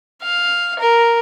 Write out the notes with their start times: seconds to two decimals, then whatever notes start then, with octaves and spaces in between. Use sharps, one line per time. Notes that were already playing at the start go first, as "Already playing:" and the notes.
0.22 F5
0.79 A#4